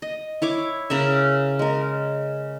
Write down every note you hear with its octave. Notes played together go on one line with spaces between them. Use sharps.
D#5
E4 C#5 D6
C#3 A#4 E5
G#3 A#4